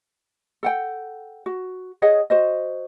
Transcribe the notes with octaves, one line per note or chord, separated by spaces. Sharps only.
A4 F#5 G5
F#4
G#4 C#5 D#5 F#5
F#4 C5 D#5